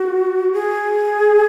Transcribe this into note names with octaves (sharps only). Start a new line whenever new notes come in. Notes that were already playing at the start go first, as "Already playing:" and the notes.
Already playing: F#4
G#4